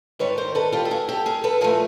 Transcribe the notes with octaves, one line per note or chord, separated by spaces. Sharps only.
G#2 D#3 G3 B4 C#5
A#4 C5
A4 B4
F4 G4
A4
F#4 G#4
G4 A4
G#4 A#4
A4 B4
A#2 F3 A3 G#4 A#4